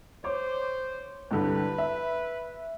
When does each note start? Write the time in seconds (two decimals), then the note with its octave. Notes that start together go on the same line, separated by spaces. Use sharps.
0.24 C5 C#5 D6
1.31 C2 G2 D3 B4
1.78 E5